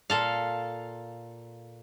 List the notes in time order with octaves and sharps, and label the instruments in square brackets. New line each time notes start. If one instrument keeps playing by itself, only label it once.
[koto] A#2 A4 F5